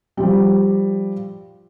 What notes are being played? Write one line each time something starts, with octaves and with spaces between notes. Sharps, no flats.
F3 G3